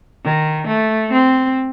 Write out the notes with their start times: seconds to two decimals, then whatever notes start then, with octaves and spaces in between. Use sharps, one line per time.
0.25 D#3
0.68 A3
1.12 C4